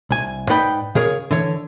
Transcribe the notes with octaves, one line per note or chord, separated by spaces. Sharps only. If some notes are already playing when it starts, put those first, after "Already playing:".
C2 G#5
G#2 D#4 B4 D5 G5 B5
C#3 G#4 A#4 C#5
D3 E3 C#5